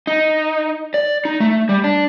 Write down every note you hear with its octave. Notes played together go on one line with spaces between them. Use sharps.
D#4
D5
D#4
A3
G3
D4